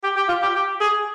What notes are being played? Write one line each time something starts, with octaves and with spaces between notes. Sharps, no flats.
G4
G4
F4
G4
G4
G#4